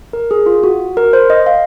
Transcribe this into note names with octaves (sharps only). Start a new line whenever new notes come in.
A#4
G#4
F4
F#4
A#4
C5
D#5
F5